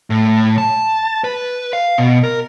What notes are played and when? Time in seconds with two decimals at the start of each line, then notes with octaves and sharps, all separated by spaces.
0.10 A2
0.58 A5
1.24 B4
1.73 F5
1.98 B2
2.24 A#4